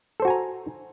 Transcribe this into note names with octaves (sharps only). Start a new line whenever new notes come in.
F#4 A4 C5 G#5 A#5